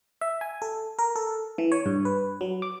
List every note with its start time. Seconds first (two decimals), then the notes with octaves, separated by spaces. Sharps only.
0.21 E5
0.41 G#5
0.62 A4
0.99 A#4
1.16 A4
1.58 E3
1.72 C#5
1.86 G2
2.05 B4
2.41 F#3
2.62 D6